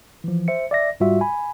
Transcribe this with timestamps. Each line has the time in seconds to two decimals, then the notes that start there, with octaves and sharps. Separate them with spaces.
0.24 E3 F3
0.48 C5 E5 C#7
0.71 D5 E5 A#6
1.00 G#2 G3 F4 F#4 E5
1.21 G#5 B5